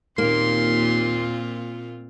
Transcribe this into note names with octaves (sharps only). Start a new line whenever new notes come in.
D#2 A#2 A#3 C4 F4 C6